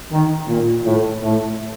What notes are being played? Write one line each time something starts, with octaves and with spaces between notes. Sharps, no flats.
D#3
A#2
A2
A2